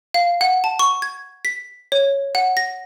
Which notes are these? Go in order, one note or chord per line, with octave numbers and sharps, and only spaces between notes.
F5
F#5
A5
C#6
G#6
B6
C#5
F#5
A#6